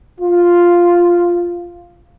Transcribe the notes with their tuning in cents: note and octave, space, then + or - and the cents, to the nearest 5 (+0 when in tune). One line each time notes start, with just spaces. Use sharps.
F4 +0